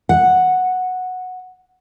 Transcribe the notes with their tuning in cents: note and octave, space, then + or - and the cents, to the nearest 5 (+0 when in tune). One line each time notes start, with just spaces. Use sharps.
F#5 -5